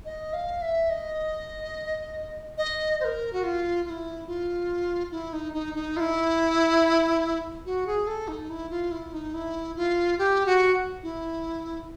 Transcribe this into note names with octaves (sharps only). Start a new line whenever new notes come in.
D#5
F5
E5
D#5
D#5
C5
A#4
F#4
F4
F4
E4
F4
E4
D#4
D#4
D#4
F4
E4
F#4
G#4
A4
D#4
E4
F4
E4
D#4
E4
F4
G4
F#4
E4